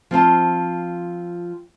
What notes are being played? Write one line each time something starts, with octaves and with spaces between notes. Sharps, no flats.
F3 C4 F4 A5